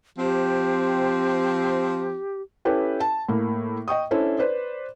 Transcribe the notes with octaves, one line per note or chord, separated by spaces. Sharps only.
F3 C4 G4
C#4 E4 G4 A4 B4 G5
A5
A2 A#3
D#5 G5 C#6 D#6
C#4 D4 E4 A4 C5
B4 C5 D5